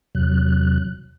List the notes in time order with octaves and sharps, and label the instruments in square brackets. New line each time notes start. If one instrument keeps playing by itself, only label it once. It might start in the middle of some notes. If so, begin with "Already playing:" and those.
[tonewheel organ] E2 C3 F#3 F#6